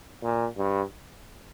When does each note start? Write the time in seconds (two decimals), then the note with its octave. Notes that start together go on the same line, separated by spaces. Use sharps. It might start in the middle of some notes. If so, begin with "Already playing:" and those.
0.23 A#2
0.57 G2